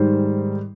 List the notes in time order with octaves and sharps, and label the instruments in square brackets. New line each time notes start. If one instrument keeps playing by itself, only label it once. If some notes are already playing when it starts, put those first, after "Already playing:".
Already playing: [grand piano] G#2 D#3 G3 C5